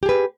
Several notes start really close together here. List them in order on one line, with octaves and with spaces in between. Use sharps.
G4 G#4 B4